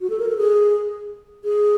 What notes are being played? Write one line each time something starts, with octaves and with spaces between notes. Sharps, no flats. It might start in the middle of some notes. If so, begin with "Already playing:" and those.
F#4
A4
A#4
A4
G#4
G#4